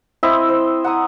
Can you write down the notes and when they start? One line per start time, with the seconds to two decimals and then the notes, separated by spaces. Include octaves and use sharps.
0.23 C4 E4 D#5 E5
0.49 C5
0.84 F#5 A#5 D#6